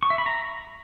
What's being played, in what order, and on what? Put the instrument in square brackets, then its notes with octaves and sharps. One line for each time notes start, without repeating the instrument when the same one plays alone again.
[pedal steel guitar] C#6
E5
B5
A#5